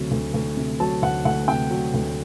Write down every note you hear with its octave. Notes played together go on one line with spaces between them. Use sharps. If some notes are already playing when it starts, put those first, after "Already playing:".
Already playing: D2 C3 F#3
D2
D2
C3
F#3 A5
D2 F#5
D2 F#5
C3 G5
F#3
D2